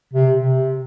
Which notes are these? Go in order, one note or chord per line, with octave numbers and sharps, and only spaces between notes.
C3
C3